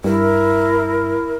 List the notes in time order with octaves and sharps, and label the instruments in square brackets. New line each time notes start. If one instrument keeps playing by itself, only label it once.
[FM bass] G2 [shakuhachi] E4 [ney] A#4